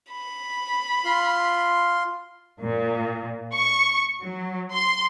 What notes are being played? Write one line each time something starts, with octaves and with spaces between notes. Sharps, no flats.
B5
F4 C6
A#2
C#6
F#3
C6